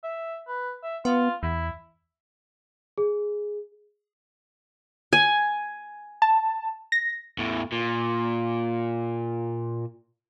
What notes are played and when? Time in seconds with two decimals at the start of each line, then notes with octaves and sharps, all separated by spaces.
0.04 E5
0.48 B4
0.83 E5
1.05 B3 F4
1.43 E2 E4
2.98 G#4
5.13 G#5
6.22 A5
6.92 A#6
7.38 E2 A2
7.72 A#2